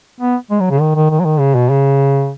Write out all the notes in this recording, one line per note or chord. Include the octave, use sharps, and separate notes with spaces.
B3
G#3
F#3
C#3
D#3
D#3
D#3
F#3
D#3
C#3
B2
C#3